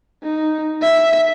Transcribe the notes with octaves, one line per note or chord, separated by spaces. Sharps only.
D#4
E5